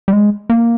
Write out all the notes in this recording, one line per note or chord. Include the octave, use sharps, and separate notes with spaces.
G3
G#3
A#3